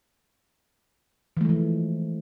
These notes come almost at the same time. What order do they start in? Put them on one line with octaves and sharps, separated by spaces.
E3 A3 G#3 F3